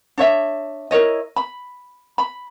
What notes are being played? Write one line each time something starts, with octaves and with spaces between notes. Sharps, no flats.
D4 C#5 E5
E4 A#4 C#5 D#5
B5
B5